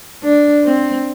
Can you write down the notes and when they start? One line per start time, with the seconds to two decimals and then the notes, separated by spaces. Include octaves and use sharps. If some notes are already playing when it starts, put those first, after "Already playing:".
0.23 D4
0.65 C4